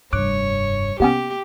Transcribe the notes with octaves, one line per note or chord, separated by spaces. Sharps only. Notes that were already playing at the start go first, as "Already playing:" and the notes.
F1 G2 C#5 D6 F#6 D7
C3 A#3 B3 C#4 G4